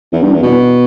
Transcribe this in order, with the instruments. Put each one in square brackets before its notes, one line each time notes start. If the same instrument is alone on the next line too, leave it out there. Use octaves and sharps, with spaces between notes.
[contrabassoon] E2
G2
E2
B2